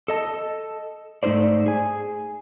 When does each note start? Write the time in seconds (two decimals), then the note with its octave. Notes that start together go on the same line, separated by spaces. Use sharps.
0.08 A4 D#5 A5
1.23 G#2 A3 D#4 A#4 C5 D5
1.66 G#4 G#5